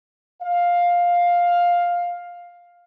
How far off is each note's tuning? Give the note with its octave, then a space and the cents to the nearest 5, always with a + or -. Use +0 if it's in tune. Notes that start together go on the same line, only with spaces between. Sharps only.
F5 +10